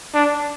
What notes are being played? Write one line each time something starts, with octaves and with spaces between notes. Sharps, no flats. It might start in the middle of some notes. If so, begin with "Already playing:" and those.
D4